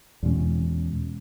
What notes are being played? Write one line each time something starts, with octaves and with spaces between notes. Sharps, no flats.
E2 B2 G#3 C#4